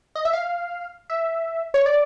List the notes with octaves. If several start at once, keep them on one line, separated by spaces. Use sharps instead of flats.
D#5
E5
F5
E5
C#5
D5